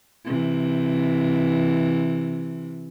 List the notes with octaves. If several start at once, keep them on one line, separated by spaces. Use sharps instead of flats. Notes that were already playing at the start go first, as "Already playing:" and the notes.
C3 E3